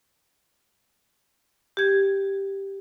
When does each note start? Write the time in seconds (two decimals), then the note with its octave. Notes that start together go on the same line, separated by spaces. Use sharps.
1.77 G4 G#6